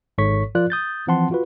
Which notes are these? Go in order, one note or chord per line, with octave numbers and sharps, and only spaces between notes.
G#1 G#2 A4 C#5 C#6 B6
F3 F4 A#4 D5 F#6
D#6 G6 A6
E3 F3 C4 F#5 A5 C6
F4 F#4 B4